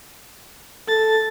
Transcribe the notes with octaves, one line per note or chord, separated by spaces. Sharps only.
A4 A6